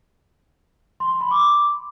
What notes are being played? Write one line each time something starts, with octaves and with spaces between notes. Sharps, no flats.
C6
C6
B5
D6